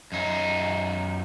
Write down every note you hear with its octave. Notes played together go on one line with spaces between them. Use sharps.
F#2 D#4